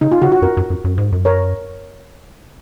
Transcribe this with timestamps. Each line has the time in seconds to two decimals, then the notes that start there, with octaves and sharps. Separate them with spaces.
0.01 C#3 D#4
0.12 F4
0.22 C#3 F#4
0.32 F#4
0.42 F#2 A#4
0.57 F#2
0.70 F#2
0.84 F#2
0.98 G#2
1.12 F#2
1.25 A#4 C#5